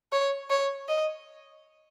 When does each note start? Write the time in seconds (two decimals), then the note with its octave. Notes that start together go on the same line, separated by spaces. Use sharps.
0.13 C#5
0.50 C#5
0.89 D#5